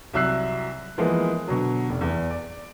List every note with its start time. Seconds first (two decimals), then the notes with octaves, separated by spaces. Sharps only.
0.13 C2 F#3 E5 E6 F#6 C7
0.98 E3 F3 G#3 A#3 B3
1.48 B2 D3 F#3
1.89 F1
2.01 E2
2.30 D5